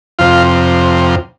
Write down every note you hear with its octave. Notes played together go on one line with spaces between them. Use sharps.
F2 C3 F4